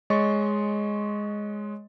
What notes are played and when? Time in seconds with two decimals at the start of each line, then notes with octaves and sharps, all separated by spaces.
0.10 G#3 C#5 D#5 C6 C#6 A6